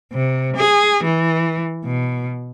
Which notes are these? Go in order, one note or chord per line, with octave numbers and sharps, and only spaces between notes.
C3
G#4
E3
B2